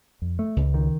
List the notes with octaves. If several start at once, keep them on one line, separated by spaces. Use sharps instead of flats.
F2
A3
C#2
D#3